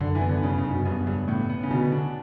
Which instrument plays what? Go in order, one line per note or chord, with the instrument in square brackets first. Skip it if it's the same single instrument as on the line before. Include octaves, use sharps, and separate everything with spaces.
[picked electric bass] F#2 [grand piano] D3
[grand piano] E3
[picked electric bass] B3
[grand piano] D3
[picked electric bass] F#2 [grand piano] C#3
[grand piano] C#3
[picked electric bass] F#2
[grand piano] B2
[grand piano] G2 [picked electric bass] B3
[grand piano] G2 [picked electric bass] C#3
[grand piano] A2 [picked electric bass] B3
[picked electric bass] B3
[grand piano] C#3
[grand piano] B2 [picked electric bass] D3
[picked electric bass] D4